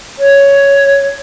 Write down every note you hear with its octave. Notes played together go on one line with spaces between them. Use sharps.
C#5